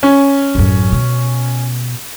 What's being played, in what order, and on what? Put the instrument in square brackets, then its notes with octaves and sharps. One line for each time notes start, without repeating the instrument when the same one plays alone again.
[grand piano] C#4
[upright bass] A1 F#2
B2